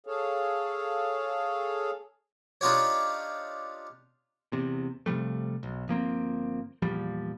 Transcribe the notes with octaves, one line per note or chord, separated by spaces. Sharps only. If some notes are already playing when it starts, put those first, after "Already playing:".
G#4 A4 C#5 F5
D4 D#4 F4 G4 C#5
E2 C3
C3 F3 G3 A3
B1
G1 F3 A#3 C4
E2 A#2 F3 G3